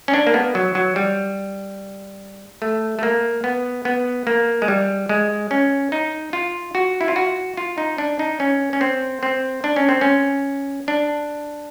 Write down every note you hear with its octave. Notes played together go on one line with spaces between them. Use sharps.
C#4
D4
A#3
B3
F#3
F#3
G3
A3
A3
A#3
B3
B3
A#3
G#3
G3
G#3
C#4
D#4
F4
F#4
E4
F4
F#4
F4
D#4
D4
D#4
C#4
C#4
C4
C4
D4
C#4
C4
C#4
D4